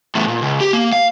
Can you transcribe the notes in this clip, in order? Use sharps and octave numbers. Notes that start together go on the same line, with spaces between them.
E2 A2
A#2
C#2
G4
A#3
F5